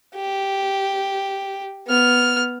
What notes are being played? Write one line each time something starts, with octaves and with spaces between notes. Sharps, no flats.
G4
B3 F6